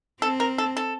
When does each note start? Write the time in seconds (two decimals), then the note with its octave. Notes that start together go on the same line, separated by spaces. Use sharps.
0.21 C4 A4
0.40 A#4
0.58 A4
0.77 A4